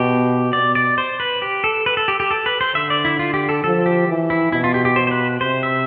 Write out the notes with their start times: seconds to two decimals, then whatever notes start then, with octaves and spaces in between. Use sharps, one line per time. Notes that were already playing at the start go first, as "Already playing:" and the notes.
Already playing: B2 G4
0.53 B2 D5
0.75 D5
0.98 C5
1.20 B4
1.42 G4
1.64 A4
1.86 B4
1.97 A4
2.08 G4
2.20 G4
2.31 A4
2.46 B4
2.61 C5
2.75 D3 E5
2.90 D5
3.05 E4
3.19 F4
3.34 G4
3.49 A4
3.64 F3 A4
3.86 G4
4.08 E3
4.30 E4
4.52 B2 E4
4.64 F4
4.74 G4
4.85 G4
4.96 C5
5.07 C5
5.11 B4
5.41 C3 C5
5.63 E5